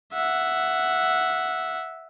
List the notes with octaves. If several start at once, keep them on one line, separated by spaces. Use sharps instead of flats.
E5 F#5